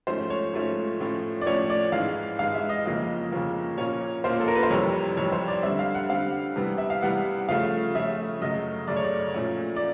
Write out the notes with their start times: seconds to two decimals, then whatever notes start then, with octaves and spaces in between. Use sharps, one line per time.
0.07 G#2 F3 A3 C#4 C5
0.30 C#5
0.53 G#2 F3 A3 C#4
1.00 A2 F3 A3 C#4
1.41 D5
1.46 A2 F3 A3 C#4 C#5
1.70 D5
1.92 G#2 E3 G#3 F5
2.39 G#2 E3 G#3 F5
2.54 E5
2.69 D#5
2.85 F2 C#3 F3 A#3 C#4 D#5
3.32 F2 C#3 F3 A#3 C#4
3.78 A#2 F3 A#3 C#4 C#5
4.24 A#2 F3 A#3 C#4 C5
4.40 A4
4.48 A#4
4.55 B4
4.63 C5
4.70 F2 C3 E3 G3 C#5
5.17 F2 C3 E3 G3 C#5
5.32 C5
5.48 D5
5.63 D3 G3 C4 E5
5.79 F5
5.94 F#5
6.09 D3 G3 C4 F5
6.56 C3 E3 G3 B3
6.78 E5
6.90 F5
7.02 C3 E3 G3 B3 F#5
7.49 C#3 F3 A3 C#4 F5
7.95 C#3 F3 A3 C#4 E5
8.42 F#2 C#3 F#3 A3 D#5
8.88 F#2 C#3 F#3 A3 D5
8.96 C#5
9.04 D5
9.34 A#2 F3 A3 C#4
9.76 D5